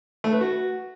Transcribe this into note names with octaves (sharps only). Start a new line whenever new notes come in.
A3
B4
F#4